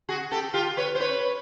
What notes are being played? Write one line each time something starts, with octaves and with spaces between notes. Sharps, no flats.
F#4 G#4
G4 A4
F4 G4
B4 C#5
C5
B4 C#5